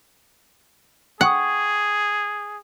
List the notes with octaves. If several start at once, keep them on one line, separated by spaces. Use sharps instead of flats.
G#4 F#5 G5 C#6 D#6